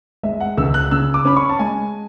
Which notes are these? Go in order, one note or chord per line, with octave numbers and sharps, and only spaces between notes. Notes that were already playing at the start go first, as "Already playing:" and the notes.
G#3 E5
F#5
C#2 E6
F#6
C#3 E6
D6
C#4 B5
C#6
A5
G#3 G#5